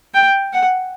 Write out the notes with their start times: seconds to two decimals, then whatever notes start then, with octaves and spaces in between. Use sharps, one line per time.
0.15 G5
0.53 F#5